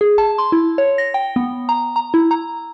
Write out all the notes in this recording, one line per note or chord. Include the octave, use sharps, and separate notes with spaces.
G#4
A5
C6
E4
C#5
A#6
G5
B3
A#5
A#5
E4
A#5